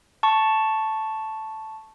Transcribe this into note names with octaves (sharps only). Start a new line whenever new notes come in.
A5 C#6